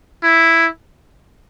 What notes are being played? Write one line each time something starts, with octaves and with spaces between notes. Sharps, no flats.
E4